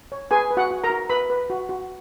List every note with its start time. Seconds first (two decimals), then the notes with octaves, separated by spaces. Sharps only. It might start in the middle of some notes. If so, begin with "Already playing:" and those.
0.12 C#5
0.31 G#4 B4 G#5
0.51 B4
0.57 F#4 F#5
0.71 F#4
0.84 A#4 A#5
0.90 F#4
1.09 B4 B5
1.30 B4
1.50 F#4
1.69 F#4